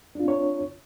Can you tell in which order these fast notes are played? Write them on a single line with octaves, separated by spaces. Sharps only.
D4 F4 C4 C#5